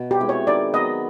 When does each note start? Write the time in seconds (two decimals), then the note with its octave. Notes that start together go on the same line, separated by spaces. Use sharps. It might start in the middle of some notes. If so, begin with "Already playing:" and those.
Already playing: B2
0.11 G4
0.20 G#3 C4 E4
0.29 C#5
0.47 D#3 D5
0.74 F#3 B3 D#5